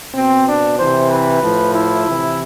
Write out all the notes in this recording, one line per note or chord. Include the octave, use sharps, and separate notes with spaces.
B2 C4
D4
C3 E3 C5
B4
A2 F3
E4
C3 E3